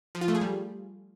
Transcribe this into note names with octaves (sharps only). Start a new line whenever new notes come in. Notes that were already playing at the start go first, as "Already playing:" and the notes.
F3
F4
A3
G#4
G3